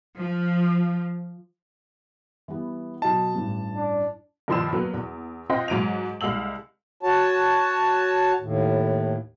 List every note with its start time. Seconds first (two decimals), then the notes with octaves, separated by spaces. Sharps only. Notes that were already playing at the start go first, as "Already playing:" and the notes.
0.18 F3
2.48 E3 G3 B3
3.02 B2 F#3 D#5 A5
3.34 A1 G2
3.75 D4
4.48 G2 D#3 F3 C6 E6 E7
4.73 F#3 A#3 B3
4.93 E2
5.50 C4 F4 D#5 F#5 G5 C6
5.68 G#2 F#3 D7 D#7 F7
6.21 C2 G#3 F5 E6 F#7
7.03 F#4 C#5 A5
8.40 D#2 A2